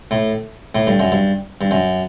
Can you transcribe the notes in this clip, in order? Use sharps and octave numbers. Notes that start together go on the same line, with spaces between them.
A2
A2
G2
F#2
G2
G2
F#2